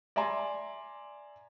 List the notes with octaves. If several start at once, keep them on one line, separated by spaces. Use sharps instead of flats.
D5 E5 G#5 A#5 C6